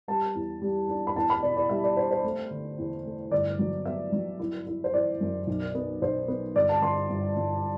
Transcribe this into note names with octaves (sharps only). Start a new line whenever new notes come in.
G3 A5
E2
G3
D4
B5
E2 A5
B5
B2 D5
D5
G3 E5
D5
D4 C5
C5
A3
D3
E2
A3
G1 D5
F#3
B3 E5
F#3
E4
E4
C5
E3 D5
F#2
B1
B3
B1 C5
B3
G1 D5
A5
G1 C6
G1
G1